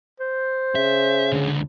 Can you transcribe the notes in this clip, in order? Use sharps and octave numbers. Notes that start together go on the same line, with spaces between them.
C5
C#3 E5
C#2 D3